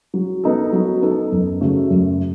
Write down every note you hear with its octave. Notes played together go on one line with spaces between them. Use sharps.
F#3
B3 D#4 A4
F#3
B3 D#4 A4
F#2
C#3 F#3 A3
F#2